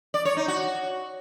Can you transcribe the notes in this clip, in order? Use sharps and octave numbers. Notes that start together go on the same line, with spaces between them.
D5
C#5
D#4
F#4